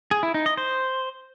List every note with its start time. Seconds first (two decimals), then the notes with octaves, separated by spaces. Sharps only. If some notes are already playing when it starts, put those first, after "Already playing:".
0.11 G#4
0.23 E4
0.34 D#4
0.46 D#5
0.57 C5